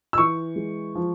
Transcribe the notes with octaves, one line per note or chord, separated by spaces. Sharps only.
E6
E3 C#6
G#3
F3